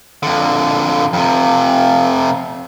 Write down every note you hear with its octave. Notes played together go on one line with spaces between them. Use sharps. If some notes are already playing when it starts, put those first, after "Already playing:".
F2 D3
F2 C3